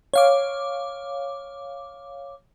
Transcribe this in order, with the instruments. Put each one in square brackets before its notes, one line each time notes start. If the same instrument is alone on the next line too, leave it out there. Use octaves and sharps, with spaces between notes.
[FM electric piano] C#5 F5 D6